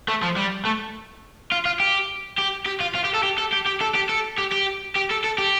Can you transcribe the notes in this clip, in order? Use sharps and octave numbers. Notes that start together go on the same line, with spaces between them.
A3
F3
G3
A3
F4
F4
G4
G4
G4
F4
F4
G4
A4
G4
A4
G4
G4
A4
G4
A4
G4
G4
G4
A4
A4
G4